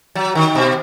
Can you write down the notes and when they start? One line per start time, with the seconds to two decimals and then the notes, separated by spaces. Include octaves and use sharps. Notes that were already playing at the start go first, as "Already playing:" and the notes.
0.15 F#3
0.35 D#3
0.55 B2